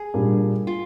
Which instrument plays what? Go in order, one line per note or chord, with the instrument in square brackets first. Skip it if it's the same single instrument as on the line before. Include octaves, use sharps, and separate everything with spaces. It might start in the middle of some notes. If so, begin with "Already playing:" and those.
Already playing: [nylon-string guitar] G#4
[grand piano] A#2 G3 A#3 D4
[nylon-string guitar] F4